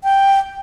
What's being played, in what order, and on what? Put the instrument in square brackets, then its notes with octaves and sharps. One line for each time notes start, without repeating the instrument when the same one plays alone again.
[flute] G5